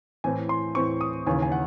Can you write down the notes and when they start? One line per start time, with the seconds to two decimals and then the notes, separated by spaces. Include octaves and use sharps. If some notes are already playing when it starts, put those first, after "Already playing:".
0.24 A2 E3 C4 G#5
0.49 C6
0.75 A2 E3 C4 C#6
1.01 D#6
1.27 D#2 C#3 E3 G#5
1.42 G#5
1.52 F#5